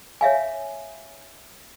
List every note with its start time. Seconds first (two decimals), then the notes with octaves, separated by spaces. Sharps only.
0.21 C#5 E5 F5 G#5